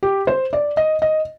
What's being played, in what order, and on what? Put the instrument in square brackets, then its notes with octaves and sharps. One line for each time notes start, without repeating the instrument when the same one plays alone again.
[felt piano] G4
C5
D5
D#5
D#5